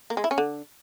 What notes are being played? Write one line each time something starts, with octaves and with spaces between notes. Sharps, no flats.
A#3
G#3
E4
C#4
D3